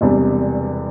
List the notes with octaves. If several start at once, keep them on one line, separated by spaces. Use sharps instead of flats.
E1 E2 C3 G3 D4